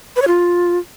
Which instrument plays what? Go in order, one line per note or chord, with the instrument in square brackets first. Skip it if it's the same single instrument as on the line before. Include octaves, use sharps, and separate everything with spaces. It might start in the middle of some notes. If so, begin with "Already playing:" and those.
[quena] B4
C#5
F4